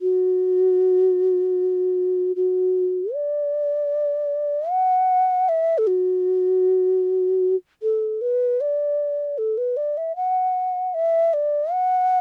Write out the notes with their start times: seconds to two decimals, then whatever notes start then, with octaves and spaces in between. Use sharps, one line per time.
0.02 F#4
2.36 F#4
3.14 D5
4.70 F#5
5.49 E5
5.78 A4
5.87 F#4
7.83 A4
8.21 B4
8.61 D5
9.38 A4
9.58 B4
9.77 D5
9.97 E5
10.16 F#5
10.94 E5
11.34 D5
11.72 F#5